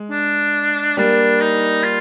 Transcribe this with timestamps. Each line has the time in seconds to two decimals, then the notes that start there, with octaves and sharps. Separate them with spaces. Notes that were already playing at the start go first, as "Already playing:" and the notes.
Already playing: G#3
0.11 D4
0.97 G3 A#3 D4
1.40 D#4
1.84 F4